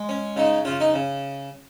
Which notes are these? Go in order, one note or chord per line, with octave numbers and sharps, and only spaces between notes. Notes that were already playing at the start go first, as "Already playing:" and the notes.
Already playing: G#3
C#4
C#3 D#4
C#3 F4
D#4
C#3